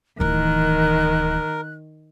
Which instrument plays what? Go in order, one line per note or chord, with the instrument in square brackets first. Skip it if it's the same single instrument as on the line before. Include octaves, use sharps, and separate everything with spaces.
[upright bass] D1 E3 [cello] D#3 [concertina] A#4 [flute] F#6